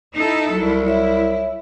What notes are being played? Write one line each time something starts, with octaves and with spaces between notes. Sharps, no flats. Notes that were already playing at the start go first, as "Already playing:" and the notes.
D#4 E4 A4
C2 F#3 E4
E4 C#5 E5